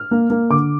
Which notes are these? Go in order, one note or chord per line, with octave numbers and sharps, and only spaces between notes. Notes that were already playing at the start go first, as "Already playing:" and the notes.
Already playing: F6
A#3
A#3
D3 D6